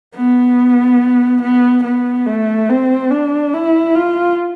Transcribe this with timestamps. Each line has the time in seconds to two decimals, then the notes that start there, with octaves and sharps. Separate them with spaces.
0.15 B3
1.42 B3
1.84 B3
2.27 A3
2.69 C4
3.11 D4
3.54 E4
3.95 F4